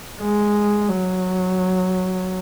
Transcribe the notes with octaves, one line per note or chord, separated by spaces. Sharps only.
G#3
F#3